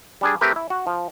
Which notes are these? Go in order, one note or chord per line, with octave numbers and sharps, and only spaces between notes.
G3 D4 G#4
A3 C4 G4 A#4 B4
E4
F#4
F3